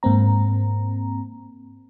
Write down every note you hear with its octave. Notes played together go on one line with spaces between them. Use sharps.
G#2 A#3 C4 A#5